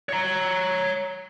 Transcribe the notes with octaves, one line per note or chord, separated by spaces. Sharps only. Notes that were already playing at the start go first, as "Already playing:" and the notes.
C#5 A#5